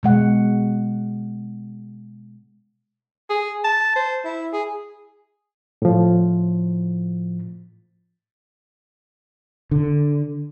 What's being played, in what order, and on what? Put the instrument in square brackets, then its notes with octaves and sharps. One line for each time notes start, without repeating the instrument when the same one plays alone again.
[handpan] B2 G#3 F#5
[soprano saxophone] G#4
A5
C5
E4
G#4
[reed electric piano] A2 F3
[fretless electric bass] D3